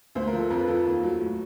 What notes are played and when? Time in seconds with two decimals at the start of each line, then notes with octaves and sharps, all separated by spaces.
0.15 D2 C5
0.27 A#4
0.33 F3
0.39 A4
0.50 F2 A#4
0.59 B4
0.68 F3 A4
0.85 D#2
1.03 F#3
1.20 A2